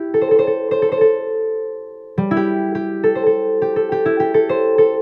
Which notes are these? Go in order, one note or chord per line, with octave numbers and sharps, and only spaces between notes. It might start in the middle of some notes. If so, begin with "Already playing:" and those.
Already playing: E4 G4
A4
C5
A4
C5
A4
C5
A4
C5
A4
G3
E4
G4
G4
A4
C5
A4
G4
A4
G4
E4
G4
A4
C5
A4